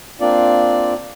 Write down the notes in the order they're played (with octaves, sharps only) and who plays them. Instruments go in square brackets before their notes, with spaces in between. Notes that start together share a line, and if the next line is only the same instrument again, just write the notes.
[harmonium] A#3 C4 D4 F4 D5